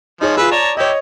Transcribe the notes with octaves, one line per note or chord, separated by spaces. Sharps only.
F3 D#4 G#4 C#5
F4 G#4 B4 E5
C#5 D5 A5 A#5
E4 G4 C#5 D#5